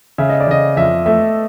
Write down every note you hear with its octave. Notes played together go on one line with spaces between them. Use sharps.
C#3 E5
D#5
D5
C#3 D#5
F2 E5
A3 E5